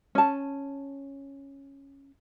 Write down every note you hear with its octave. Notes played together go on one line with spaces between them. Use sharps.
C#4 A5